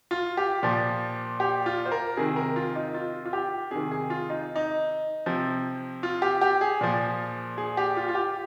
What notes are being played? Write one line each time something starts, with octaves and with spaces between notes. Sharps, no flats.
F4
G4
A#2 F3
G4
F4
C5
A#4
C3 D#3 G#4
A#4
F4
D#4
F4
F4
G4
C3 D#3 G#4
G#4
F4
D#4
D#4
C3 F3
F4
G4
G4
G#4
A#2 F3
G#4
G4
F4
F4
G4